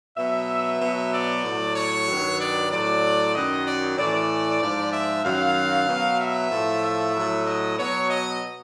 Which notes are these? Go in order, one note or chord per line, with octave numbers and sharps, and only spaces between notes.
B2 F#3 E5
B2 F#3
D5
A2 F#3
C#5
G2 D#3 F#3
D5
A2 F#3 D5
F#2 D#3 F#3 D#5
D5
A2 E3 D5
G#2 F3
E5
F#2 D#3 F#3 F5
B2 F#3
E5
A2 F3
E5
A2 F#3
D#5
B2 F#3 C#5
D#5